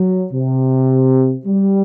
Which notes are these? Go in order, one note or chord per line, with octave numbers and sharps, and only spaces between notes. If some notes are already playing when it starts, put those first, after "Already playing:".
Already playing: F#3
C3
G3